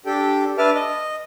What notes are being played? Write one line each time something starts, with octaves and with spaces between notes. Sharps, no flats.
D4 G4 A4 G5
D4 B4 E5 A5 D6 F6
D#5